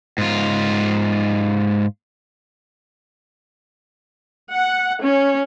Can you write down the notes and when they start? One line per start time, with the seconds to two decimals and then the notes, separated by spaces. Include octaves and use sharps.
0.18 G#2 F4
4.52 F#5
5.02 C#4